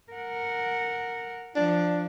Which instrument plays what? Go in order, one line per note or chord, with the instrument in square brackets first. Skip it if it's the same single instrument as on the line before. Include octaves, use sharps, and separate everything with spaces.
[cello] A#4 F#5
[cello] F3 [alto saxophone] D4